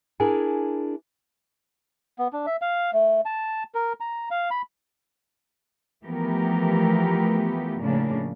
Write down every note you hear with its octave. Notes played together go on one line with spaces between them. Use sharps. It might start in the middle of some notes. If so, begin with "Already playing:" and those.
D4 E4 G#4 A#4 G#5
B3
D4
E5
F5
A3
A5
A#4
A#5
F5
B5
E3 F3 A3 B3 G4 A#4
A2 C#3 F3 A#3 D4